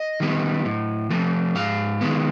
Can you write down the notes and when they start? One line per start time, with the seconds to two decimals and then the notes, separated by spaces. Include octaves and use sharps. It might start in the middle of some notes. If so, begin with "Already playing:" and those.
Already playing: D#5
0.20 D#3 G3 B3
0.65 A2
1.10 F3 A3
1.55 G#2 F5
2.01 D#3 G#3 B3